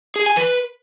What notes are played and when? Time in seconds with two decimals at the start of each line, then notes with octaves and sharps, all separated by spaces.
0.16 G#4
0.26 G#5
0.37 B4